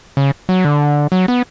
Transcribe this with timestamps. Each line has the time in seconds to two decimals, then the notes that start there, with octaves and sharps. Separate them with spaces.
0.17 C#3
0.49 F#3
0.65 D3
1.12 F#3
1.28 B3